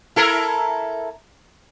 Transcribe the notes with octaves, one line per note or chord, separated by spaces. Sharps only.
E4 A4 A#4